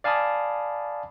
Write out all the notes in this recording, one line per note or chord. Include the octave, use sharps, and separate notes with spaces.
D5 F5 G#5 A5 B5 D#6